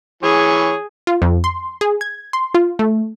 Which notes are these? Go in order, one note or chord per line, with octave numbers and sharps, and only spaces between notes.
E3 G#4 C#5
F4
F2
C6
G#4
G#6
C6
F4
A3